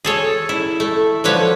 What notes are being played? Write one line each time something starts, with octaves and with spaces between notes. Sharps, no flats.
G#4 A4 C#5
E4
A3
D3 F3 B4 C#5